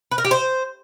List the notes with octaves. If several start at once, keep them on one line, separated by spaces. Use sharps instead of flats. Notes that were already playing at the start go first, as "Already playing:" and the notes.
B4
A#4
G4
C5